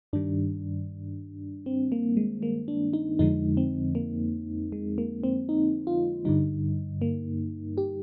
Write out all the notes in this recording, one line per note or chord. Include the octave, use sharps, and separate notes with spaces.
G2 D#3 G3 D4
C4
A#3
G#3
A#3
D4
D#4
F2 D3 F3 G#3 D#4
C4
A#3
G#3
A#3
C4
D#4
F4
G2 D3 G3 D#4
A#3
G4